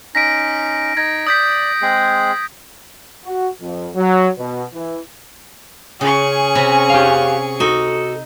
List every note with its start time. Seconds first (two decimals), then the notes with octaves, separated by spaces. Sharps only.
0.15 C#4 D#4 A#6 B6 D7
0.97 D#4 G#6 A#6
1.27 D5 D#6 G6 B6
1.82 G#3 C4 G#4
3.25 F#4
3.62 F2
3.96 F#3
4.38 B2
4.74 E3
6.01 C#3 C#4 G#4 G#5 C#6
6.55 C3 F#4 B5
6.90 G4 F5
7.60 D#4 F#4 A4